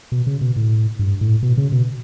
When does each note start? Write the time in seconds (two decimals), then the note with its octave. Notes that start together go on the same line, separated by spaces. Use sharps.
0.12 B2
0.27 C#3
0.41 B2
0.56 A2
0.99 G2
1.21 A2
1.43 B2
1.57 C#3
1.72 B2